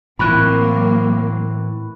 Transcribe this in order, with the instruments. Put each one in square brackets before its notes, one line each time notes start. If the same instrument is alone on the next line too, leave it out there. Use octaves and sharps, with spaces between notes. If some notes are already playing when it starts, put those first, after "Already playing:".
[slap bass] A2 E3 [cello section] F#3 A#3 C4 [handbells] B5 C#6 F#6